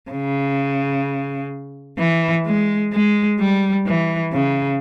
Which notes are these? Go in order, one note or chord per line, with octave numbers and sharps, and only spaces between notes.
C#3
E3
G#3
G#3
G3
E3
C#3